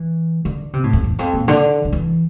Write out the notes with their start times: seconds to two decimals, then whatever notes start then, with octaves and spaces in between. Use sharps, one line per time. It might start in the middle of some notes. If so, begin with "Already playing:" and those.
Already playing: E3
0.45 D3
0.73 C3
0.84 A2
0.93 F2
1.04 E2
1.19 F2
1.33 A#2
1.48 D3
1.85 D3
1.92 E3